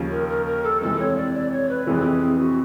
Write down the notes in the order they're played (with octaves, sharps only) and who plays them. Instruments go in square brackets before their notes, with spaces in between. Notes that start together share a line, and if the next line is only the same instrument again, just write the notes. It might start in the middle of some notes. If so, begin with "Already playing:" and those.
Already playing: [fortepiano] D#2 C#3 F3
[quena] A#4
A#4
A#4
A4
[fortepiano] F2 C3 E3 G#3 [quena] A4
[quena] C#5
D5
D5
C#5
B4
[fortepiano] F2 C3 E3 [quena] G#4 A4
[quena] F#4